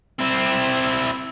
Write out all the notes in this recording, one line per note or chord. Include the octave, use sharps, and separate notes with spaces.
C4 E4